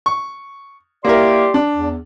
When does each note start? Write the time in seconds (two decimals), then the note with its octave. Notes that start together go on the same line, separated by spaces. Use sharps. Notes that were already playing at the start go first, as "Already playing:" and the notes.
0.06 C#6
1.05 A#3 E4 G4 A#4 D5 C6
1.54 D4
1.75 E2